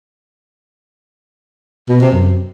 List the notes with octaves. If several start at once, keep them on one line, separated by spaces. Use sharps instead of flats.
B2
C3
F#2